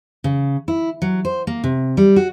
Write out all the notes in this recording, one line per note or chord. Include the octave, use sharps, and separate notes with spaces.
C#3
E4
F#3
C5
A#3
C3
G3
F#4